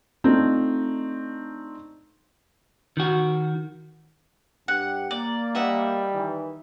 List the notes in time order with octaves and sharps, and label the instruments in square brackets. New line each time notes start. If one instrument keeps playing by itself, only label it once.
[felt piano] A3 C4 D4 D#4 F4
[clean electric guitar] D#3 F#4
[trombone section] G2 G4 [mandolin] F#5
[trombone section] A#3 [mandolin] D5
[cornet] G3 [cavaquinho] D#5 E5 F#5
[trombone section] D#3 E3